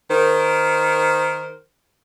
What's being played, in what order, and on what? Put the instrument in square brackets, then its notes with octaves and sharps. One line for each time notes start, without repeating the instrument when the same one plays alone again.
[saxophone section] D#3 A#4 C5